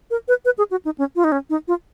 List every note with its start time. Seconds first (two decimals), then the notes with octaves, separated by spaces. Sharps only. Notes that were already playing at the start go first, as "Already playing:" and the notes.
0.11 A#4
0.28 B4
0.45 B4
0.58 G#4
0.71 F#4
0.85 D#4
0.98 C#4
1.16 F4
1.24 D#4
1.32 C#4
1.50 D#4
1.68 F4